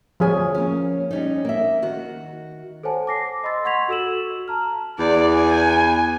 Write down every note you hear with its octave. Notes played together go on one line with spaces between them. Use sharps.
D2 F3 G#4 C#5 G#5
A#3 C#4
G3 C#4 D#4
A#3 E5
D#3 F#4
A4 C5 C#5 F#5 G#5 A5
D6 A#6 C7
D#5 B5 C6 E6 A6
F#5 C6 C#6 G#6 B6 F7
F#4 A4 E6 E7 F#7
A5 A#5 F6
E2 D5
G#5